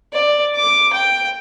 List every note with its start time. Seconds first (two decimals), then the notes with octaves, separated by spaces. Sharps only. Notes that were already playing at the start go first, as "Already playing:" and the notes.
0.13 D5
0.56 D6
0.93 G5